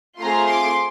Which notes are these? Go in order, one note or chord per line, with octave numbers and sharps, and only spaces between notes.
A3 C4 F4 G#4 A#5 C6
C6 D6